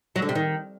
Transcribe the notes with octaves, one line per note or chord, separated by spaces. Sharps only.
F#3
D3
C3
D#3